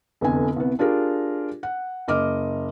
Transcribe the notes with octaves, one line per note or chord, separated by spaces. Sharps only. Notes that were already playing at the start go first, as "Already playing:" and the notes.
F1 E2 D3 G#5
C2 B3
D4 F4 G4 G#4 A#4
F#5
F#1 D#5 D6 F6